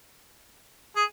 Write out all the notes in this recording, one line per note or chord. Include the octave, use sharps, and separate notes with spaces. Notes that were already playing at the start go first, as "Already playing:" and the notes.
G#4